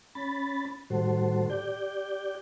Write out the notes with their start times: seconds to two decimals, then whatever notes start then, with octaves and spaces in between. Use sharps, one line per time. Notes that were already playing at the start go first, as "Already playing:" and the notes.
0.15 C#4 B5 A6
0.90 A2 D#3 G3 F#4 A4 C5
1.50 G4 D5 G6